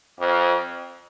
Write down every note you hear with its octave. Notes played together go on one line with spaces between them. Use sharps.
F2